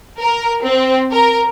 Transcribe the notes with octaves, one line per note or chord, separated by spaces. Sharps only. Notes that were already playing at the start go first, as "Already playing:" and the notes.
A#4
C4
A#4